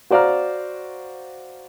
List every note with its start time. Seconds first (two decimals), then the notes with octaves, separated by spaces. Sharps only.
0.10 F#4 C5 D5 F5 A#5 F6